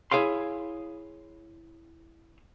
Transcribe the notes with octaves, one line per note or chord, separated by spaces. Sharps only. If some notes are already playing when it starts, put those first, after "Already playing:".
E4 G#4 C#5 F5 C6